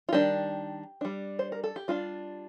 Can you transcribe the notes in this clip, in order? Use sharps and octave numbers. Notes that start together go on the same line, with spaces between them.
F4
D#3 G3 D4 G4
G3 D4
C5
A#4
A4
G4
G3 D4 F4